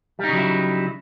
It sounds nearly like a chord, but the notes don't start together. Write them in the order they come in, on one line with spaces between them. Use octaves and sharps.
G3 D#4 C#3 F#3 E4